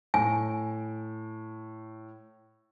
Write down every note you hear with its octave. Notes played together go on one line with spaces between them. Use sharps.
A2 G#5